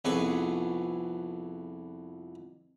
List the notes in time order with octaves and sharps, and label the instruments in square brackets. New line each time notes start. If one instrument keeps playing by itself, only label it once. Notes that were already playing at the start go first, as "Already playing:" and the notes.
[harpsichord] C2 F2 B3 G#4 B4 C#6